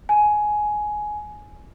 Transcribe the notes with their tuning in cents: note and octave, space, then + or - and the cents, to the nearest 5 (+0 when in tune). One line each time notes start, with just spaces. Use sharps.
G#5 +15